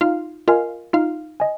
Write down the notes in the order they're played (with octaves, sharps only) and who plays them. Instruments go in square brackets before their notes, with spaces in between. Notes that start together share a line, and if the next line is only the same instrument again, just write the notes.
[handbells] D#4 [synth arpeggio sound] F4 F5
[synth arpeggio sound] F4 F5 [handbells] A#4 D#5 G#5
[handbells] D#4 [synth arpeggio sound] F4 F5
[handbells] D#5 G#5